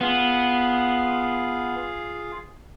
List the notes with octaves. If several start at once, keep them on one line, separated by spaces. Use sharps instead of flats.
B3 F4 G#4 F5